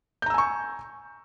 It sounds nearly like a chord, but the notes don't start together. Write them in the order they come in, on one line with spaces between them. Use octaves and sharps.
G6 A#5 E6 G#5 C#6